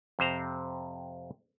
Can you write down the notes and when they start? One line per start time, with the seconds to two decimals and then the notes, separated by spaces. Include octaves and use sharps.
0.19 F2 C3 C5 A#5